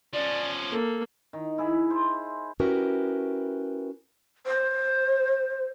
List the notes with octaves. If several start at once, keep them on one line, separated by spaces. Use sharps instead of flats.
F3 C#4 D5
A#3 A4
D#3
E4 G#4
C5
C#4 E4 F#4 G4 A#4 B4
C5